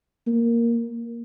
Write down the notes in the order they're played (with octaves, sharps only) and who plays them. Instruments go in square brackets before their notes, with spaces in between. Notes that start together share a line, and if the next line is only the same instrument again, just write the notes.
[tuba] A#3